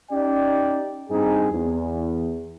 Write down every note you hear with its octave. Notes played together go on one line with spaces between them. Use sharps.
C#4 D#4 G4 D5 G5
G2 C4 D#4 G#4
E2